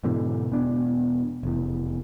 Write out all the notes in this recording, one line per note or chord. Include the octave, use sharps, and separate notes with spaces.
G#2 B2 D3 E3
E1 B3 D4
F1 E2